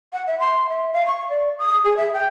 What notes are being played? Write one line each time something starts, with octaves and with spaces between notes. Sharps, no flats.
F#5
E5
C6
E5
F5
C#6
D5
D#6
G#4
E5
G5